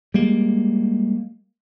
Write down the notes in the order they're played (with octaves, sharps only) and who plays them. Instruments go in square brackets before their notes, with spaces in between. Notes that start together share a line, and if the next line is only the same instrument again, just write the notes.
[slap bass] G3 G#3 A#3